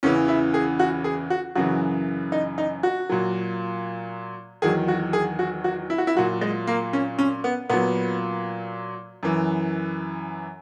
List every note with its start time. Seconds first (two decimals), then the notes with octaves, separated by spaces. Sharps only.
0.03 E2 C#3 E3 C#4
0.28 E4
0.54 G#4
0.79 F#4
1.04 G#4
1.30 F#4
1.55 F#2 C#3 E3 F#4
2.32 D#4
2.58 D#4
2.83 F#4
3.09 A#2 F#3
4.62 E2 D#3 F#3 G#4
4.88 F#4
5.13 G#4
5.39 F#4
5.64 F#4
5.90 E4
5.98 F#4
6.07 E4
6.15 A#2 F#3 F#4
6.41 G#3
6.67 A#3
6.93 C#4
7.19 C#4
7.44 B3
7.69 A#2 F#3 B3
9.23 F#2 E3